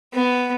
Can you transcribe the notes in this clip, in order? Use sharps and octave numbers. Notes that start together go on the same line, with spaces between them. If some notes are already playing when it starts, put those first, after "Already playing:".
B3